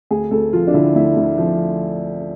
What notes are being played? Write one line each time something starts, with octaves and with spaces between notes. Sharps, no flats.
D2 G#4
D2 A4
F3 F4
D4
D3 E4
D2 E4
D2
F3